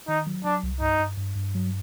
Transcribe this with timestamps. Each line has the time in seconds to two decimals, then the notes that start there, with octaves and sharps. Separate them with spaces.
0.08 D#3 D#4
0.27 F#3
0.44 F#3 D4
0.63 C2
0.81 G2 D#4
0.99 G2
1.18 G2
1.36 G2
1.55 F#3